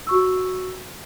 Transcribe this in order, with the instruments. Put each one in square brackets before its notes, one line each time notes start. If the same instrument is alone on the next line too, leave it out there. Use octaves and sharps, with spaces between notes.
[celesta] F#4 C#6 E6